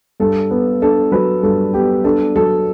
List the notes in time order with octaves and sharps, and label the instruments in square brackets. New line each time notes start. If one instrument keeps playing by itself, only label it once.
[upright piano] G2 [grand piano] A4
[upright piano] B3
[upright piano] D4 [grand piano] A4
[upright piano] F#3 [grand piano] B4
[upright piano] G2 [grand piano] A4
[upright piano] B3 [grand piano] G4
[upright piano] D4 [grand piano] A4
[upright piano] F#3 [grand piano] A4